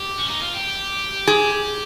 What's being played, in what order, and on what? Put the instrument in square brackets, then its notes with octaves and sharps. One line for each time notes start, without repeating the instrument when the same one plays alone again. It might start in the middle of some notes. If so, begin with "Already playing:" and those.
Already playing: [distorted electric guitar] G4
C#4
D#4
F4
G4
[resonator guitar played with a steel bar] G#4